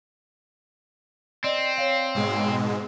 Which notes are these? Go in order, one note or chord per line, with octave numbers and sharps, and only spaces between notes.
C4 D5 D#5
C#5 F5
G#2 B2 G#3